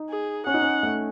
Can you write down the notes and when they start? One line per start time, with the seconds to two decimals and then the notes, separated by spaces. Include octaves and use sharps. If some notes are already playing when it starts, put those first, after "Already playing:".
Already playing: D#4
0.10 G#4
0.47 C#4 F#5
0.54 D#4
0.62 C#4
0.83 A3